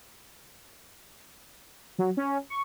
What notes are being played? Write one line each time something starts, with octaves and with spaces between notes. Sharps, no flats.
F#3
C#4
C#6